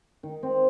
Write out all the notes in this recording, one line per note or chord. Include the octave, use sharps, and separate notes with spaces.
D#3
C4